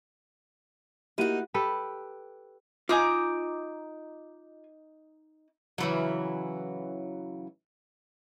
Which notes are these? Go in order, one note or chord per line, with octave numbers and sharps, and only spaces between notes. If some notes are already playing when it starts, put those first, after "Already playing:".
A#3 D#4 E4 F#4 G4 F#5 D#7
G4 A4 B4
D#4 F4 G#5 A#5 D6
C#3 E3 F#3